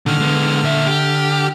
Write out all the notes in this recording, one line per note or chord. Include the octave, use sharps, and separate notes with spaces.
A#2 D3 D#3 F6
G#3 B3
A#2 E5
G4